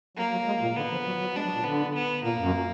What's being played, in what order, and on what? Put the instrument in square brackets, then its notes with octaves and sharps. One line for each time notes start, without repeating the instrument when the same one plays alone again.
[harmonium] F#3 [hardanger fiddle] A#3
[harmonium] F#3
G#3
A#2
[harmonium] D3 [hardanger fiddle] B3
[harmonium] F3
F#3
F#3
[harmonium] G#3 [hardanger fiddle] D4
[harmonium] F#3
A#2
[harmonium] D3 [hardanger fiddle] B3
[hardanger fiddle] B3
[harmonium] A#2 [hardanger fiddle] A#3
[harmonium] F#2